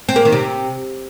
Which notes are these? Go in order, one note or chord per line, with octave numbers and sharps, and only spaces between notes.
C4
A#3
D#3
C3